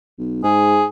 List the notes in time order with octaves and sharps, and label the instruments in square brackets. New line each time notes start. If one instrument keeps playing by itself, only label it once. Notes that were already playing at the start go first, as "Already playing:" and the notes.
[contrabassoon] B1
[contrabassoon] G#2 [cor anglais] G#4